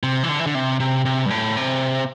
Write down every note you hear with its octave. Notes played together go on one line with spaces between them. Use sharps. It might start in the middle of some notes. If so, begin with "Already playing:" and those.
C3
E3
D3
E3
D3
C3
C3
C3
G2
A2
C3